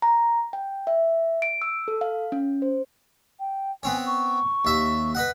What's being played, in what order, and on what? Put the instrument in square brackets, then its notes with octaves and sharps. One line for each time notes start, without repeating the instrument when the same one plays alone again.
[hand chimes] A#5
G5
E5
D7
E6
A4
F5
C#4
C5
[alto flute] G5
[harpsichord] B3 C4 C#5 [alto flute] G#5
[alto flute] C#6
[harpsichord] D#2 E5
B4 D#5 F#5